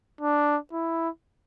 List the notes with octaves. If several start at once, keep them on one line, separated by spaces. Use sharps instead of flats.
D4
E4